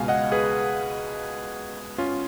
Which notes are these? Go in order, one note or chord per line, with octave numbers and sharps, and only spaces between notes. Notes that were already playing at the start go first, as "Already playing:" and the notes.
Already playing: C#2 B2 G#3 F5 G#5
D#5 F#5
G#4 B4
C#4 F4